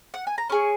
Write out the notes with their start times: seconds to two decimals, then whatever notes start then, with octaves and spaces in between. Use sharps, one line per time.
0.14 F#5
0.27 G#5
0.38 A#5
0.50 C#4 G#4 C#6